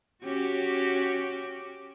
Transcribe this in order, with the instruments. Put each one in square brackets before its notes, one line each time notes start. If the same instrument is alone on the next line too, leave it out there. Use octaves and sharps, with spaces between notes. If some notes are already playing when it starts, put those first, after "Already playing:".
[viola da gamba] C#4 F#4 G4